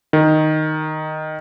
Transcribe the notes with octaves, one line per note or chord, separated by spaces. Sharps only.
D#3